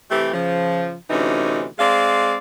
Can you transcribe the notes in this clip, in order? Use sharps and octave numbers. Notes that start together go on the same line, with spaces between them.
C3 E3 A3 G4
C#3 F3
D2 C3 E3 C#4 D#4
G#3 C4 D5 F5